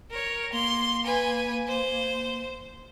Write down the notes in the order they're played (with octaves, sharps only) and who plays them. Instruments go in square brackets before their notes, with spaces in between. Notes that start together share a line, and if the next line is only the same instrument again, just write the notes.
[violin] A#4 C#5
[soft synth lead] A#3 [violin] C6
[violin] B4 G#5
C5